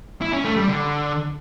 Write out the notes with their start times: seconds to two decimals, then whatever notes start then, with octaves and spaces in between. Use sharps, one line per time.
0.21 E4
0.33 C#4
0.45 A3
0.57 G3
0.68 D3